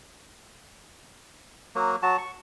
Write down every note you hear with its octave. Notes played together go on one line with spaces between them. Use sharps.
F#3 A#3
F#3 F#4 A5
C#6